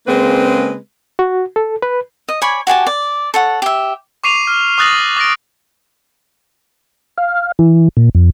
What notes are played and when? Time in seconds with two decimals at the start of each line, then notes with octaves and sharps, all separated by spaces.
0.07 C#3 G#3 A#3 C4 C#4 B4
1.19 F#4
1.56 A4
1.82 B4
2.29 D#5
2.42 C#5 D5 G#5 B5
2.67 F#4 G4 G#5 A5
2.87 D5
3.34 A4 C#5 F#5
3.62 G4 E5
4.24 C#6 D6 C7 D#7 F7
4.47 F6
4.78 C#6 D#6 F#6 A6 A#6 F#7
5.17 D6 A6 A#6 D7
7.18 F5
7.59 E3
7.97 A#2
8.15 F2